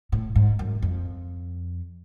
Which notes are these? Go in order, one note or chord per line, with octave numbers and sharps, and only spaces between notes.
A2
G#2
F#2
F2